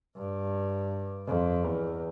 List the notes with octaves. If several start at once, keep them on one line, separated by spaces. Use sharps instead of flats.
G2
F2
E2